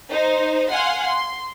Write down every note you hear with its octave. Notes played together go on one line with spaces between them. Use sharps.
D#4 C5
F5 F#5 G#5 C6
C6